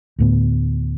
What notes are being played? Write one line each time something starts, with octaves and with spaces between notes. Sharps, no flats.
D2 A2 B3